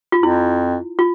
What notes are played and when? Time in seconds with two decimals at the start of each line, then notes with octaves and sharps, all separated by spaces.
0.12 F4
0.23 F2 E4
0.99 F4